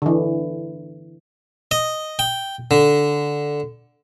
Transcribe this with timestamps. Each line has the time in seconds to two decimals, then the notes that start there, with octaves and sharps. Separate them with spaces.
0.02 D3 E3
1.71 D#5
2.19 G5
2.71 D3